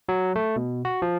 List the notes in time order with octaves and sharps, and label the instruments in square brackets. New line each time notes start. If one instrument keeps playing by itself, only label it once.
[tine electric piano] F#3
A3
B2
F#4
F3